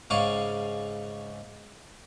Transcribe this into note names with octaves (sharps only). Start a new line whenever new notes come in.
G#2 C#3 D5 F5 G#5 C#6